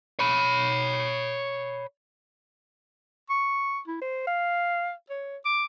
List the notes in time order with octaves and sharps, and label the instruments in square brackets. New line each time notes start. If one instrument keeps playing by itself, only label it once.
[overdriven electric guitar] C#5 B5
[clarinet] C#6
E4
C5
F5
C#5
D6